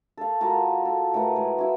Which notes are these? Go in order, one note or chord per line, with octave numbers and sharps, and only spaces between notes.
A4 F5
G#3 F4 F#4 A#4
A4
A2 A#4 B4 F#5
G#3
E4 F#4